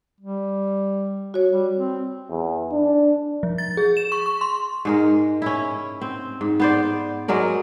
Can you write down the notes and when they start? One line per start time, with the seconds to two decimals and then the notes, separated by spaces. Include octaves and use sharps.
0.21 G3
1.34 F#4 C#5
1.50 G3
1.76 C4
2.30 E2
2.72 D4
3.43 F3
3.58 A6
3.77 G#4
3.97 E7
4.12 C#6
4.26 C#6
4.41 C6
4.85 G#2 G#3 A#4
5.42 C#4 E4
6.01 C4
6.41 G#2
6.60 B3 C5 D5
7.28 F#3 G#3 A#4 D5